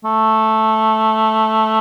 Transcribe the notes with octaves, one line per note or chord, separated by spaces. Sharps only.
A3